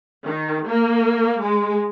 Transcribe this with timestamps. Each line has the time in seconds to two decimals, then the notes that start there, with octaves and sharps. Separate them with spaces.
0.25 D#3
0.66 A#3
1.40 G#3